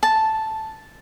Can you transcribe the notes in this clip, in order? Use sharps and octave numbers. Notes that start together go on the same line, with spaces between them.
A5